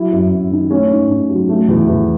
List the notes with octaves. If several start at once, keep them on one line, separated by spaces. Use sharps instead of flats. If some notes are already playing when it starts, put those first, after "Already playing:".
Already playing: F#3 E4
F#2
F#2
D#3
A3 C#4
G#2
G#2
F#3
A3
E2
E2